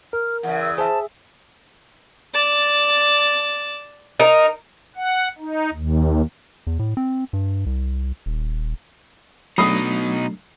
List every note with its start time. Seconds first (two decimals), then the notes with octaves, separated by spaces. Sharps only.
0.13 A#4 F6
0.43 E2 C#3 F#5
0.61 E6
0.78 G#4 C5 E5 A5
2.33 D5 A5
4.20 D#4 A#4
4.96 F#5
5.38 D#4
5.73 D#2
6.67 E2
6.79 A2
6.97 C4
7.33 G2
7.66 C2
8.26 D#1
9.58 B2 F#3 A3 D4 D#4 B5 D#6 C7